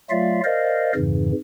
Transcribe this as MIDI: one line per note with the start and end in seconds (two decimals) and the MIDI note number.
0.10 0.41 54
0.10 0.41 57
0.10 0.41 65
0.10 0.41 74
0.10 0.41 76
0.10 0.41 77
0.44 0.92 70
0.44 0.92 72
0.44 0.92 74
0.44 0.92 75
0.44 0.92 77
0.95 1.32 41
0.95 1.32 44
0.95 1.32 49
0.95 1.32 52